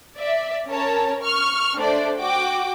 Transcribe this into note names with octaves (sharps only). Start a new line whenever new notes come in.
D5 E5
C#4 A#4 C#5 A5
C#6 F6
A3 D4 C5 D5
F#4 G5 D6